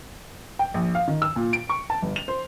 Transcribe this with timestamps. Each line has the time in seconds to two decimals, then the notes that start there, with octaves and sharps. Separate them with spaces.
0.59 G5
0.74 A#1
0.95 F5
1.08 D#3
1.22 E6
1.36 A#2
1.53 D7
1.69 C#6
1.90 A5
2.02 G1
2.16 F7
2.28 C5